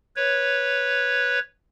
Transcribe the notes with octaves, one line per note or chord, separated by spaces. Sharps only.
B4 C#5